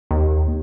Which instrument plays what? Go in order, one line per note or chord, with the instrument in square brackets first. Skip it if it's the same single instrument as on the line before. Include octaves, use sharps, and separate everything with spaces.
[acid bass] D#2